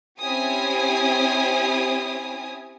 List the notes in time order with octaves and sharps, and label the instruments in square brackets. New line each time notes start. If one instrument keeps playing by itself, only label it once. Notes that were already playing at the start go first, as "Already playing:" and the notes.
[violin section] C4 C#4 E4 G4 G#5 D#6